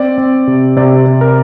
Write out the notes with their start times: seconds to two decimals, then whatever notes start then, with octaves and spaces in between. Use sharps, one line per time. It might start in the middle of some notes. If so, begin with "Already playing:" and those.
Already playing: C4 D5
0.18 C4
0.47 C3
0.77 C3 D5
1.06 C3
1.21 A#4